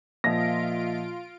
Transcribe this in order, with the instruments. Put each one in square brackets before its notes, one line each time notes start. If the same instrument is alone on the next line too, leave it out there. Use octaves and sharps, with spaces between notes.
[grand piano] A#2 F3 [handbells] A#3 D#5 E5 [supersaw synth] F4 D7 [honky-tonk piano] A#6